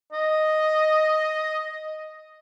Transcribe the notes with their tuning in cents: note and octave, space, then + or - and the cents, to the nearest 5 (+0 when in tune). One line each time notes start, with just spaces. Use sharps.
D#5 +0